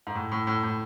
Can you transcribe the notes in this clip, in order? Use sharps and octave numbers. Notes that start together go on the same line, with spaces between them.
G#2
A2
A2
A2
A2